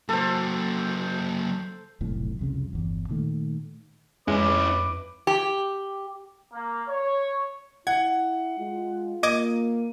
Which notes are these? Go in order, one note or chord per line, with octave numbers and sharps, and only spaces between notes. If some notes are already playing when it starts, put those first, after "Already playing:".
F#3 A#3 A4 C5
F1 B1 F2 A2
C2 F2 C#3
G1 E2
A#2 D#3 A3
F2 G#3 C#4 E4 B4 D6
G4
A#3
C#5
E4 F#5 G#6
G#3 F4
A#3 D#5 D6 G#6 D#7